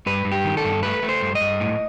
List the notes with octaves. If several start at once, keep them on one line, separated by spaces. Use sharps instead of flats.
G2 B4
G2
G4
D#3
A4
G2
A3 B4
A3
C5
G2
D#5
G2
A2